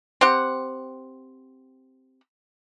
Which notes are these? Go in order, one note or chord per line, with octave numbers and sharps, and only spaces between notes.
C4 G4 F#5